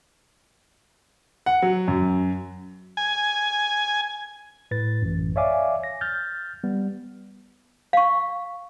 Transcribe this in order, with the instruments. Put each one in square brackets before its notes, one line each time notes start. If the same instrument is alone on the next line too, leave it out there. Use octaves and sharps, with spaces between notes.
[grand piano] F#5
F#3
F#2
[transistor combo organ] G#5
[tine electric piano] A2 B4 A6
A1 F#2
C#5 D5 E5 F5 G#5 D6
A#6
F6 G6 A6
G3 B3
[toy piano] F5 C#6